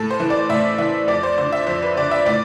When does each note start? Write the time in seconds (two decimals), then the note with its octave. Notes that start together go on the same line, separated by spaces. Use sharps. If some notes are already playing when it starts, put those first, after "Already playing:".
Already playing: A2 A4
0.11 C5
0.20 E3
0.30 D5
0.49 A2 E5
0.78 E3 E5
1.08 F2 D5
1.23 C5
1.38 D3 C5
1.52 E5
1.67 F2 C5
1.83 B4
1.97 D3 D5
2.11 E5
2.26 A2 D5